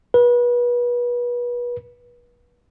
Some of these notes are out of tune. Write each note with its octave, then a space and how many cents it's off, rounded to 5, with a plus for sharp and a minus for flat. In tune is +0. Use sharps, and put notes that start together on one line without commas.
B4 -30